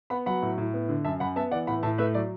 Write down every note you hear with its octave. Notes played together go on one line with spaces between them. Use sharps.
B3 F#5 B5
F#3 F#5 B5
A2
A2
B3
D3
F#2 E5 A5
F#2 F#5 B5
B3 E5 A5
E3 D5 F#5
A2 F#5 B5
A2 E5 A5
A3 B4 E5
F#3 D5